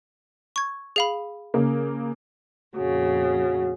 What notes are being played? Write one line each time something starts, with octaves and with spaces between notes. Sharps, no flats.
C#6 G#6
G#4 F5 B5
C#3 A#3
F2 A#2 C#3 F#4